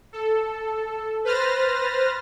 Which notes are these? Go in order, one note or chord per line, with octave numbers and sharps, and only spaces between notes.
A4
B4 C5 F6 A6 A#6